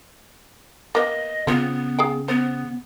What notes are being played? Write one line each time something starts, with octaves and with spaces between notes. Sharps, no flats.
A#3 B3 D#5
C#3 B3 C4 F4
G#4 F5 G5
B3 C5